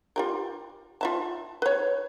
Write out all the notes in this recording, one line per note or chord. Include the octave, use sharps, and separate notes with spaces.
F4 G4 A#4
F4 E5 A5
B4 C#5